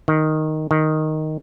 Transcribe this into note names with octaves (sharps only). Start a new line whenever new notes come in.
D#3
D#3